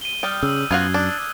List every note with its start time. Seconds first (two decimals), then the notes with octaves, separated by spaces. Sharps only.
0.01 D#7 G7
0.23 G3 G5 D#6 F6 G6
0.43 C#3 E6
0.71 F#2 B3 F4 F#4 F#6 G#6 C7
0.94 D4